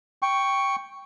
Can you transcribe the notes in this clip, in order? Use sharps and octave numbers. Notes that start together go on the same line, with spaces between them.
G5 C#6